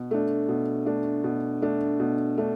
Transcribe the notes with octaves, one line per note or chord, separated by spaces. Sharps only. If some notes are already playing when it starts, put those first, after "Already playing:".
Already playing: B2
A3 D4
B2
A3 D4
B2
A3 D4
B2
A3 D4